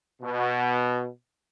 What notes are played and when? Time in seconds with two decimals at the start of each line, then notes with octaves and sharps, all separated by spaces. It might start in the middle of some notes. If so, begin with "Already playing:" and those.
0.22 B2